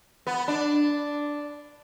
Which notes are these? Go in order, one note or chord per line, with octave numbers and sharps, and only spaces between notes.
B3
D4